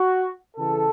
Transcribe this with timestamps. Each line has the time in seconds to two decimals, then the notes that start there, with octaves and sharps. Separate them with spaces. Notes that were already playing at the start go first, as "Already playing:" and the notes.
Already playing: F#4
0.57 C#3 E3 A4